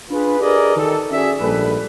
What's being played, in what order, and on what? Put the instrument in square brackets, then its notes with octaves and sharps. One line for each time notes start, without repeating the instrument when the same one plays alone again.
[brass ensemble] D4 F4 G#4 B4
G4 G#4 A#4 B4 D5 D#5
D#3 A4
C#4 F#4 G#4 D5 E5
A#1 G#2 G3 A4 B4